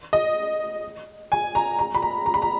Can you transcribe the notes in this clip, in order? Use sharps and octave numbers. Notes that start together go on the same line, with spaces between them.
D#5
G#5
A#5
A#5
B5
A#5
A#5
B5
A#5